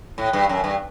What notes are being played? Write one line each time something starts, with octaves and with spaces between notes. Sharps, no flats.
A2
G2
F#2
G2